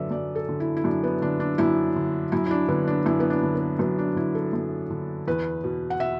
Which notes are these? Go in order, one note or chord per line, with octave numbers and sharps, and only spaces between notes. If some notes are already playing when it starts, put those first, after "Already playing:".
Already playing: F#2 D3 A4 B4 D5 E5
F#2 D5
A4
D3
E4
E4
F#2 D4
B3
D3 D4
D4
F#2 E4
D3
F#2 E4
E4
D4
D3 B3
D4
F#2 E4
B3
D4
D3
B3
F#2 B3
D4
D3 E4
A4
F#2
D3
E2 B4
B2
F#5
E5